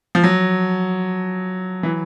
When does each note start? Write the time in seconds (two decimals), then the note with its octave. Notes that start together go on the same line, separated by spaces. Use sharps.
0.15 F3
0.24 F#3
1.83 E3